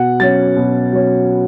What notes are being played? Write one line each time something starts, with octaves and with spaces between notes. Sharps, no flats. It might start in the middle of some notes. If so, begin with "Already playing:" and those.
Already playing: B2 F#5
F#3 C#4 A6
B2
F#3 C#4